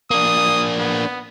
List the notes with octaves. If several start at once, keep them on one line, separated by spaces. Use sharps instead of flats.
A#3 D4 D#6
B3